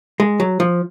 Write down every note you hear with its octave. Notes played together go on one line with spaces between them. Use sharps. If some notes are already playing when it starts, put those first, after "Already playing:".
G#3
F#3
F3